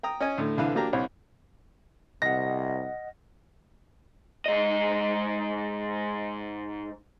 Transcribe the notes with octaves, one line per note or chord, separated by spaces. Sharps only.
G5 A#5 D#6
C#4 D#5 G#5
D2 A2
C2 D3 E3 B4 F5
F#3 A#3 D4 G4 A#5
C2 C3 C#5
C2 C3 D#5 F#5 A#6
G#2 D#5